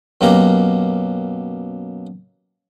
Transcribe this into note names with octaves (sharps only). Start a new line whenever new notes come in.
F#2 B2 A#3 G4 A#5